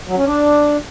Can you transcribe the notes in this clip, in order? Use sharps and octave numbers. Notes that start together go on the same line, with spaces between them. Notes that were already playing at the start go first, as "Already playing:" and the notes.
F#3
C#4
D4